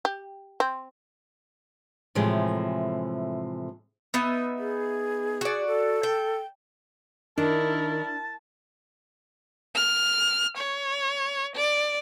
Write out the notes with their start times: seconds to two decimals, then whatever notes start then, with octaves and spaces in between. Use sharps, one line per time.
0.05 G4
0.60 C4
2.15 A2 C3 E3 F3 G#3 A3
4.14 B3 D#4 E5
4.59 G#4
5.41 F#4 D5
5.67 A4
6.03 G5
7.38 D#3 D4 E4 A#4 A5
9.76 F6
10.58 C#5
11.56 D5